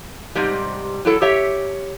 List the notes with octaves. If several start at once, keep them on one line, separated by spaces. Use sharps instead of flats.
G#2 C3 G3
F#3 E4 A4
G4 C#5 E5